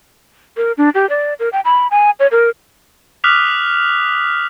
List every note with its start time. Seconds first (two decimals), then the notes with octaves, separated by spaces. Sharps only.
0.57 A#4
0.78 D4
0.95 G4
1.10 D5
1.40 A#4
1.53 G5
1.65 B5
1.91 G#5
2.20 C#5
2.32 A#4
3.24 D6 D#6 F6 F#6 B6 F7